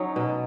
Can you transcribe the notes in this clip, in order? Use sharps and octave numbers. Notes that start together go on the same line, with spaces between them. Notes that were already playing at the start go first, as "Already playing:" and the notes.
Already playing: F#3 C#4 D#4
B2